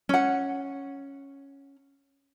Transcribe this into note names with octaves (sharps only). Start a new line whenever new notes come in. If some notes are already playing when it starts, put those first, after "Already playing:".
C#4 F#5